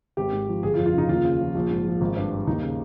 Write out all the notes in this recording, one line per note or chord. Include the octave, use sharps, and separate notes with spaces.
G#1 G4
G#2
F3
G1 G#4
F4
F2
F4
C#3
D#4
D#2 F4
C#3
F3
A#1
G#2
F3
G#1
G2
G3
D#2 D#4
C#3